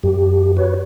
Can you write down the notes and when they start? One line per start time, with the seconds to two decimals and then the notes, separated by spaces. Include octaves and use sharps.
0.03 F#2 G4
0.57 F#4 B4 C#5